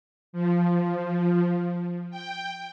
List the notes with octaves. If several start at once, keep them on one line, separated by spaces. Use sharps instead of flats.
F3
G5